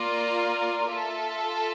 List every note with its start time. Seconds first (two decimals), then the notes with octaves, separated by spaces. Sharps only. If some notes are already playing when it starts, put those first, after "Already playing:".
Already playing: A#3 F4 A#4 D5
0.91 F4 A4 E5